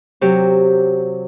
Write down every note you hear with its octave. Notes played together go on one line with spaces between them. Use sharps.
C3 F#3 G4